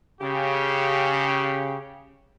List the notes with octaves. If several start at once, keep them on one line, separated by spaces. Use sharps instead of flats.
C#3 G4